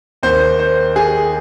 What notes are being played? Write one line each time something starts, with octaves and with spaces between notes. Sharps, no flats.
D#2 D#3 C5
C5
G#4